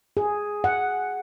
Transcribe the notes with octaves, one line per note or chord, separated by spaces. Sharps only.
G#4
F#5